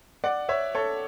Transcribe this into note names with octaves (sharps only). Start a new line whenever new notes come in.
D5 F#5
C#5 E5
A4 C#5